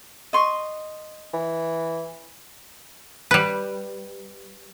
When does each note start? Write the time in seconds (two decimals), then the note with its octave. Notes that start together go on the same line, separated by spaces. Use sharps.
0.33 D#5 C6 C#6
1.34 E3
3.31 G3 B4